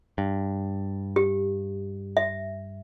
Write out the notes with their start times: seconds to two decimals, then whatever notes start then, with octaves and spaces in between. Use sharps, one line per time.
0.18 G2
1.16 G4
2.17 E5